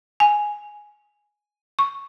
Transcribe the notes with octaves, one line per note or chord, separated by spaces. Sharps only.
G#5
C#6